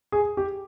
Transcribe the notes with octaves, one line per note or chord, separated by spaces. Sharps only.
G#4
G4